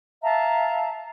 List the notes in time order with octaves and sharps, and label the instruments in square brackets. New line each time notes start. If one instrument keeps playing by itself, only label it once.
[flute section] E5 F5 A5 A#5